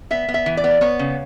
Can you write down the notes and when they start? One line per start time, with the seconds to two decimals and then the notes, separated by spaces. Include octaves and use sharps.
0.11 B3 E5
0.28 B3
0.34 E5
0.46 E3
0.57 D5
0.64 B3
0.81 B3 C#5
0.99 C#3